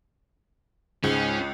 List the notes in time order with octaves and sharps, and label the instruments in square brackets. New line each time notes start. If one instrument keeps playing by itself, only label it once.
[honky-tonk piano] C#2 [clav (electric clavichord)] G#2 [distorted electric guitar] C#4